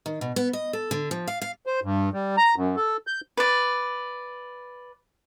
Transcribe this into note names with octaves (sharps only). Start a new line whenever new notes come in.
D#3
B2
B3
D#5
A4
D3
F3
F5
F5
C5
G2
G3
A#5
F#2
A4
G6
B4 D5